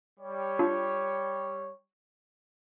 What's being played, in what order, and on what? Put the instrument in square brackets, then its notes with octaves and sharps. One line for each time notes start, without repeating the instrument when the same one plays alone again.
[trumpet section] G3 C#5
[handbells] D4 F4